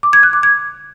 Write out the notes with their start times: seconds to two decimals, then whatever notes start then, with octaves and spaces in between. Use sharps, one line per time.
0.03 D6
0.13 G#6
0.23 F#6
0.33 D6
0.43 G#6